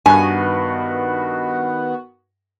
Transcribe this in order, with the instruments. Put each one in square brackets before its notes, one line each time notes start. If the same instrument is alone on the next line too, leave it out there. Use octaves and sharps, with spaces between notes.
[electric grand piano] G2 [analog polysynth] D#3 B3 F#4 [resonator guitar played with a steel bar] G#5